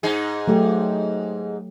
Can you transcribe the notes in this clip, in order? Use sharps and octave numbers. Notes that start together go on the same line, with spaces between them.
G#2 D#4 G#4
F#3 A3 G4